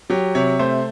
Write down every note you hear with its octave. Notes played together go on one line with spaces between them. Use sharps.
F#3 G4
C3 C#5
A3 C5